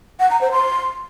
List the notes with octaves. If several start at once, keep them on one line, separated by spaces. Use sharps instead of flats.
F#5
A#5
C5
C6